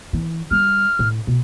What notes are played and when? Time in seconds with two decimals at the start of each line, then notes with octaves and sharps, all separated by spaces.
0.13 E3
0.51 G3 F6
0.99 A2
1.27 B2